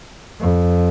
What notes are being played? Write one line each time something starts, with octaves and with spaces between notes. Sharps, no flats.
F2